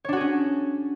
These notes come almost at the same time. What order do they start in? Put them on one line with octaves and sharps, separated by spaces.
C#5 D4 F#4 G#4 C#4